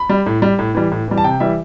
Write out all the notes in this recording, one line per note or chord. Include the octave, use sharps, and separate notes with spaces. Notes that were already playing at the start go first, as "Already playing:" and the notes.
Already playing: B5
G3
A2
G3
A2
E3 G3
A2
E3 G3
A5
C3 G5
E3 G3 E5